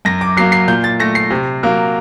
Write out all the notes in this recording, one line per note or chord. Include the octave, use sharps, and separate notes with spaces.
F#2 A#6
D6
F#3 A#3 C7
C7
A#2 G6
A6
A3 A#6
C7
C3
F#3 A#3